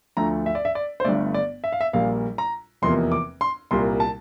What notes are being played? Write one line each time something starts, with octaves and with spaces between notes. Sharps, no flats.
D2 D3 F3 A3 A#5
E5
D5
E5
D5
C5
G1 G2 D3 A3 D5
D5
E5
F5
E5
A#1 A#2 G3 A#3 F5
A#5
F1 E2 C3 F3 A#3 C6
D6
C6
C2 A#2 G3 A#3 C6
A5